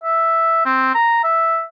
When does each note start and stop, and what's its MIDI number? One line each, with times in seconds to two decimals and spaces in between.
0.04 0.64 76
0.66 0.93 60
0.95 1.22 82
1.24 1.63 76